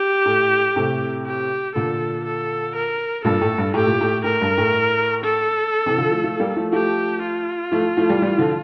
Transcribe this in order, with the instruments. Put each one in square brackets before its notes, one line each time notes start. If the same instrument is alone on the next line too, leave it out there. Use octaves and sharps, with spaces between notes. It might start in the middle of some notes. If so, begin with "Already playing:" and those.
Already playing: [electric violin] G4
[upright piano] A2
A2 C3
[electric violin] G4
[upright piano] A#2 D3 [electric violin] A4
[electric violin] A4
A#4
[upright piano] G2 A#2 [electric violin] A4
[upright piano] A2
G2
[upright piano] A2 [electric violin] G4
[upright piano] A#2
A2
[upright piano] A2 [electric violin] A#4
[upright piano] G2
A2
[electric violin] A4
[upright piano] C3 E3
D3 F3
F3 A3
F3 A3
G3 A#3
F3 A3
[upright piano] F3 A3 [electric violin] G4
[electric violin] F4
[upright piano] F3 A3
F3 A3
E3 G3
E3 G3
D3 F3